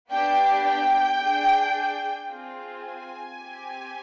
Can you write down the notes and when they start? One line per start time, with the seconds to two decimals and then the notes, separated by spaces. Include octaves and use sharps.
0.10 B3 D4 G4 G5
0.65 G5
1.20 D4 G#4
2.31 C4 F4 G#4
2.86 G#5
3.41 C4 G4